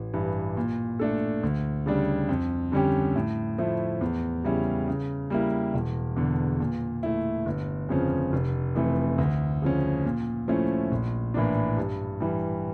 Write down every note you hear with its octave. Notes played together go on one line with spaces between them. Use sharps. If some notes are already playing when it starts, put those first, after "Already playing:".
Already playing: A1
G2 E3
A#2
A3 D4 A4
D2
C#3 G3 D4
F2
D3 G3 C#4 G4
A2
F3 A3 E4
E2
C#3 G3 C#4 E4
C#3
G3 A#3 E4
E1
E2 D3
A#2
A3 E4
G1
F2 C#3 F3 C#4
F1
F2 E3 A3
D2
C#3 F3 C#4
A#2
F3 A3 C#4 E4
A#1
A2 E3 A#3 D4
G2
E3 G3